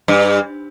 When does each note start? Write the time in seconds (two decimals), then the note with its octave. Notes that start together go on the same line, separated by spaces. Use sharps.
0.08 G2